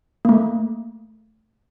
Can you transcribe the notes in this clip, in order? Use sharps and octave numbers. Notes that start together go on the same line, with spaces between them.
A3 A#3